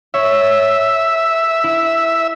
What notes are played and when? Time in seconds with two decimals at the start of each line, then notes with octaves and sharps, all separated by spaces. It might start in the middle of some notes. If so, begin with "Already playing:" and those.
0.14 C#5 E5
1.64 E4